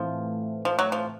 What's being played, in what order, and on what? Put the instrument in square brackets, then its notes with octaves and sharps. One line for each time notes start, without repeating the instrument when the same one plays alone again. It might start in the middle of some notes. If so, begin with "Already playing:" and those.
Already playing: [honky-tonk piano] A2 E3 A3 C4 [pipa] F3
[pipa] F3
F#3
F3